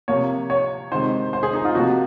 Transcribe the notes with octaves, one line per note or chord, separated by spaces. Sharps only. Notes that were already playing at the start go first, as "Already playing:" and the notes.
C3 F3 A#3 C#5
C#5
C3 D#3 G#3 C5
C5
G#4
D#4
F4
C3 F3 A#3 F#4